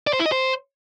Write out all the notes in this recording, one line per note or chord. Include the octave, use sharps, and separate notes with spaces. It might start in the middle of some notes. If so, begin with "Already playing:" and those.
D5
C5
E4
D#5
C5